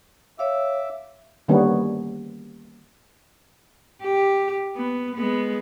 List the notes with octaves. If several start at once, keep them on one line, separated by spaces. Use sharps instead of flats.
C#5 E5 F5 D6 E6
D3 D#3 G3 A#3 B3 C#4
G4
B3
G#3 B3